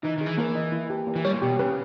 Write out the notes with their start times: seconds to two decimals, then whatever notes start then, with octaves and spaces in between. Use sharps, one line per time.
0.03 E3 D#4
0.18 D#3 G#4
0.26 E3
0.38 E3 A#3
0.55 D#5
0.72 E4
0.90 G4
1.07 A#3
1.16 E3
1.24 G3 C#5
1.33 A#2
1.42 B2 G4
1.59 C#3 B4